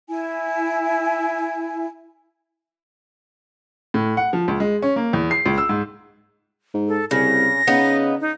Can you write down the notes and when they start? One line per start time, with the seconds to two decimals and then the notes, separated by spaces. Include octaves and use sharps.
0.08 E4 G#5
3.94 A2
4.17 F#5
4.33 F3
4.48 C#2
4.60 G#3
4.82 C#4
4.96 A#3
5.13 E2
5.31 C7
5.46 C#2
5.58 E6
5.69 G#2
6.74 G#2
6.88 A4
7.11 C2 C#3 A#6
7.67 C#3 B3 D#4
8.21 D#4